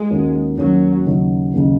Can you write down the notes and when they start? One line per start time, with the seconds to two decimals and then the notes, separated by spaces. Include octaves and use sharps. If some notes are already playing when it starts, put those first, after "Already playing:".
Already playing: G#3
0.10 D#2 D#3 A#3 C#4 F#4
0.57 D#2 D#3 F#3 A#3 C#4 F#4
1.06 D#2 C#3 F#3 D#4
1.54 D#2 C#3 F#3 D#4